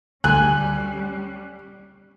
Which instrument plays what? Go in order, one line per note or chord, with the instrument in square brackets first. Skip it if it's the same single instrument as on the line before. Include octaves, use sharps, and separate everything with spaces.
[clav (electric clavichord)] D2 [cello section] G3 C#4 [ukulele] G#5 [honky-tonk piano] F#6